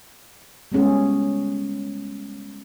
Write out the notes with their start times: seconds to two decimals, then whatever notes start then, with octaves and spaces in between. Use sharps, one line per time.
0.72 G3 G#3 B3 C#4 G#4